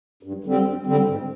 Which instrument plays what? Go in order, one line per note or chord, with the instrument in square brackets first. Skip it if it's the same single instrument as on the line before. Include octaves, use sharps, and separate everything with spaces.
[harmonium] G2
D3 G3 C4
G2
D3 G3 C4
G#2